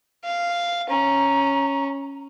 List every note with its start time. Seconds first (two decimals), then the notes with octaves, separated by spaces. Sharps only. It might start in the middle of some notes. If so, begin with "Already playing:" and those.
0.24 F5
0.90 C#4 A#5